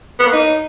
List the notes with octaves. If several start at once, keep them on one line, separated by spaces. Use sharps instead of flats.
B3
A#3
D#4